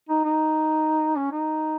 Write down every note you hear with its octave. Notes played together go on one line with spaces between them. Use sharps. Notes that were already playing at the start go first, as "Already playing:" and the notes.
D#4
D#4
C#4
D#4